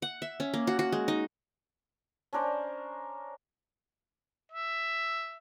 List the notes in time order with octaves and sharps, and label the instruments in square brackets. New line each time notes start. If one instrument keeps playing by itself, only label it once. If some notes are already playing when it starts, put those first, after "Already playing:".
[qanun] F#5
E5
C#4
A#3
F#4
F#4
G#3
D#4
[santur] C#4 D4 A#4 C5
[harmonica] E5